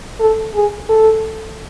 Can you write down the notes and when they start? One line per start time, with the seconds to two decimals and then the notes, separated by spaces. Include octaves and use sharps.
0.20 A4
0.55 G#4
0.89 A4